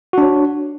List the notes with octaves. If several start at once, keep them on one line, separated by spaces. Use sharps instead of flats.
D4 F#4 C#5